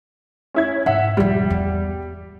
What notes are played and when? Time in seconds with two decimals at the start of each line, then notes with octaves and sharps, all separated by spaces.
0.54 C#4 E4 G#6
0.86 G#2 E5 F#5
1.17 E1 F3 G3
1.50 E2